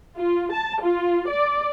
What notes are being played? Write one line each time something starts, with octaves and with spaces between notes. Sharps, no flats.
F4
A5
F4
D5